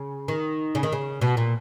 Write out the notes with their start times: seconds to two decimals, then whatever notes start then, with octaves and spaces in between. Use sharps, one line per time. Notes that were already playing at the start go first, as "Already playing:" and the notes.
Already playing: C#3
0.28 D#3
0.75 C#3
0.83 D#3
0.92 C#3
1.21 B2
1.37 A#2